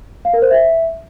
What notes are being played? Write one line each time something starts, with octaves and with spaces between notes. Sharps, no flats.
F5
A#4
C5
E5